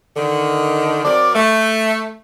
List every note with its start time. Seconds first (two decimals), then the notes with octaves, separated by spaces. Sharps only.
0.17 D3 D#3
1.05 F#3 C4 A#4 D5
1.35 A3